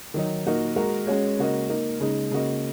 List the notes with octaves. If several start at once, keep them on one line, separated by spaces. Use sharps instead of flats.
D#3 F#3 D#4
A#2 A#3 D#4 F#4 A#4
G#3 F#4 A#4
G#3 C#4 F#4 C#5
C#3 A#3 F#4 A#4 D#5
A#3 D#4 A#4
C#3 G#3 D#4
C#3 A#3 F#4 D#5